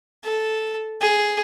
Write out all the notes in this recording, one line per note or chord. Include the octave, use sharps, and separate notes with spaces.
A4
G#4